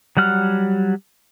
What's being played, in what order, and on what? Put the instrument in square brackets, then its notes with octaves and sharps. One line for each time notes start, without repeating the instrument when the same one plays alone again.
[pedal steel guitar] F#3 G3 F#5 F6